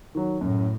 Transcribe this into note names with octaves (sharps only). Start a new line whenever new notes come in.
D#3 F#3
F#2 A2